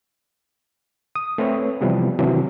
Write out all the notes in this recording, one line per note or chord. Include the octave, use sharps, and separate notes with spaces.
D#6
A3 C4 B4 C#5
C3 E3 F3 G3 B3
C3 D#3 E3 F#3